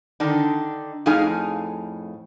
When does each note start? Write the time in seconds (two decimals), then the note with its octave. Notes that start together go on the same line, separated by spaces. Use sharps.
0.20 D3 D#3 D4 D#4
1.06 F2 A2 D#4 G#4 F5 G#5